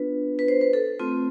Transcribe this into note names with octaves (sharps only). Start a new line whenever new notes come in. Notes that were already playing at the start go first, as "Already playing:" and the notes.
Already playing: B3 D4 F4 B4
B4
C5
B4
A4
A3 C4 F4